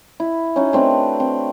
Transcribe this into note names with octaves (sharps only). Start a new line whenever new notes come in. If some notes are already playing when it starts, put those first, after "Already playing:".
E4
C#4 D#4 F#4
A3 C4 D4 B4
C4